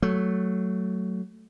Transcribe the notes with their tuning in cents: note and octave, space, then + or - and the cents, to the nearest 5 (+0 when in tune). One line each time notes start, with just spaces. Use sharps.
F#3 +10 A3 +0